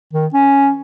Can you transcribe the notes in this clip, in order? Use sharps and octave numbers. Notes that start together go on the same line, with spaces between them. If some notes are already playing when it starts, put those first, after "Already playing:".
D#3
C#4